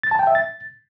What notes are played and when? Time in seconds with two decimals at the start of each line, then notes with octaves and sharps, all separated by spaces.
0.03 A6
0.11 A5
0.19 G5
0.27 E5
0.35 A6